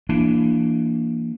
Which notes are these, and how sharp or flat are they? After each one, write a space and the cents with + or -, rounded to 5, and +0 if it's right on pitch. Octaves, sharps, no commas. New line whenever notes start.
E3 +20 A#3 +0 D4 +0